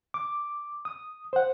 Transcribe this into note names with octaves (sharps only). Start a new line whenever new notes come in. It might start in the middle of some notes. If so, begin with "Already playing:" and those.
D6
D#6
C5 F#5